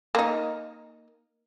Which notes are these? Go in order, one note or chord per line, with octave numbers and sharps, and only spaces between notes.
A#3 D#4